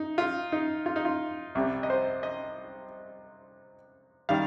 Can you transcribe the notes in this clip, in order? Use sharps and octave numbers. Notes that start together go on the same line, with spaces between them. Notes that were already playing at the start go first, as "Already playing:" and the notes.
Already playing: D#4
F4
D#4
F4
D#4
F4
C2 C3 G3
D#5
C5
D#5
D#3 G3 F5